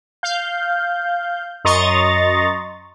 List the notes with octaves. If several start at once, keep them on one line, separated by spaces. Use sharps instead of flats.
F5 G6
F#2 D#5 A#5 C6 C#6 A6